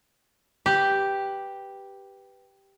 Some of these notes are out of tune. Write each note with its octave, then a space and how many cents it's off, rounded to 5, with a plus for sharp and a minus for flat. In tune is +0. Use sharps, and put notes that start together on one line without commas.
G4 +0 B4 +0